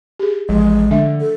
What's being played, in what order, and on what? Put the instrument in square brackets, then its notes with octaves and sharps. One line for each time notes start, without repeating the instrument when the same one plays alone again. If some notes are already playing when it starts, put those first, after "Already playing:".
[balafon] G4 G#4
[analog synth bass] A1 [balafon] F3 [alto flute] G#3
[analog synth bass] D3 [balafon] A3 D4 E5
[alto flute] A4